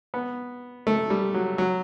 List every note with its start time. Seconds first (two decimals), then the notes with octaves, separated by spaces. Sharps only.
0.14 B3
0.87 A3
1.10 G3
1.34 F#3
1.58 F#3